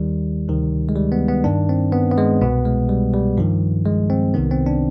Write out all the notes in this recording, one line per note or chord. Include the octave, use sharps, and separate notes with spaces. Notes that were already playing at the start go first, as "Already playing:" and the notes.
Already playing: D#2 D#3 G3
D2 C3 D#3
G#3
G3
B3
B3
G2 D#3 D4
C4
B3
B3
G#3
C2 B2 B3
G#3
G3
G3
G2 D#3 F3
G#3
C4
C2 C3 D#3 B3
C4
D4